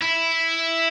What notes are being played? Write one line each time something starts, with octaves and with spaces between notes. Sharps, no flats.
E4